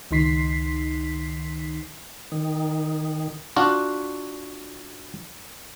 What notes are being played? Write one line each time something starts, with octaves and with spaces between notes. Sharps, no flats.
C#2 D#3 D#4 C6 B6 C7
D#3
D4 F4 F#4